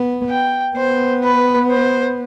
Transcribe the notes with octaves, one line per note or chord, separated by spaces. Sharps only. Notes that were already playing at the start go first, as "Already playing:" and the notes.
Already playing: B3
G5
B3 C5
B4
C5